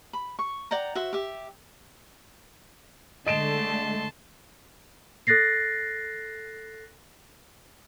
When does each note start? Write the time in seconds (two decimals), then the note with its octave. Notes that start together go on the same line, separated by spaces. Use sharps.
0.13 B5
0.39 C#6
0.71 D5 F#5 G5 A#5
0.95 F#4 C5 E5
1.13 G4 E5
3.26 D3 G#3 A3 D#5 A5 C6 D7 E7
5.27 A4 F#6 A6 A#6 C7